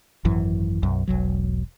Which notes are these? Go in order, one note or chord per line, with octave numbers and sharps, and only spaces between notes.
G#1 F#2 E3
B1 F#2
E1 B1 F#3